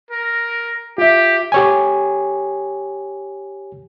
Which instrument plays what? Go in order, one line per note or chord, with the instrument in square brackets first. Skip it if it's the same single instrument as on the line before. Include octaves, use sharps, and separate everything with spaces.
[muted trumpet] A#4
[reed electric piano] F4 E5 [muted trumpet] G4
[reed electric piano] G4 C#5 G#5